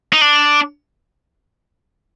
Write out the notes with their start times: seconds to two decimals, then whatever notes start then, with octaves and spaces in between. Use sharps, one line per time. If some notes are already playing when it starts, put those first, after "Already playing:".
0.13 D#4
0.21 D4